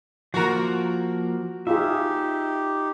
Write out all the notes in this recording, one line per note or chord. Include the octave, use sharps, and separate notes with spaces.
F3 A#3 F#4 A#4
D#4 F4 G4 G#4 E5